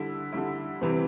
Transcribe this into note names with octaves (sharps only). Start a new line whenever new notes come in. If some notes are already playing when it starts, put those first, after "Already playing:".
Already playing: D3 G3 E4
D3 G3 E4
C3 E3 G3 C4